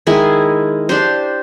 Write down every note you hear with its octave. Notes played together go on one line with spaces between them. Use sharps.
D#3 G#3 E4 G#4
D4 G4 C5